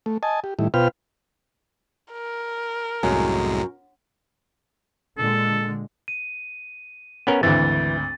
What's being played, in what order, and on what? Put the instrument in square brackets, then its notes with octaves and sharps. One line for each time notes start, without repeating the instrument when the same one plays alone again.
[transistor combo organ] A3
D#5 G#5 A5
G4
A2 D#3 G3 E4
B2 F4 B4 C5 G5 F6
[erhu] A#4
[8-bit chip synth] C2 A2 G#3 [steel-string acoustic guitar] F#2
[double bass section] A#2 D3 G#3 [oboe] A4
[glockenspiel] D#7
[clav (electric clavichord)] B3 C#4 A#4
[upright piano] G#1 D2 [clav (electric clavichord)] E3 [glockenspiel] A6